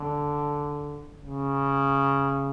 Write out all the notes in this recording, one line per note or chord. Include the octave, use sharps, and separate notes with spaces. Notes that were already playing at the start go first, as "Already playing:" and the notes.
Already playing: D3
C#3